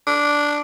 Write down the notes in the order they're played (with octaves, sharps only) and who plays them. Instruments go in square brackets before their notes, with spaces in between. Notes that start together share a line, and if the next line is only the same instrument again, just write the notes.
[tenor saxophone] D4